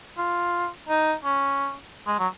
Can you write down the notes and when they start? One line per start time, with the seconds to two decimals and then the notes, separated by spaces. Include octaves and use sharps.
0.18 F4
0.89 D#4
1.24 C#4
2.07 G#3
2.19 F#3